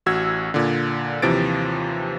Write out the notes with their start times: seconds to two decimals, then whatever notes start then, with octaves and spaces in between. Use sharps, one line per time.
0.06 A1 F#4 E6 G#6
0.54 A#2 D3
1.22 D#2 C3 E3 F3 A6 D7